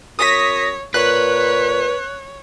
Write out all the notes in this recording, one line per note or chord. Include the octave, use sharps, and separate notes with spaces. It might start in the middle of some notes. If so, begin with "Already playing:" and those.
F#2 C#5 D#6 A#6 B6
A#2 B4 C#5 F#6